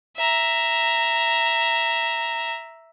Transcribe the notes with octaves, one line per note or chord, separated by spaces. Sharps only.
E5 A#5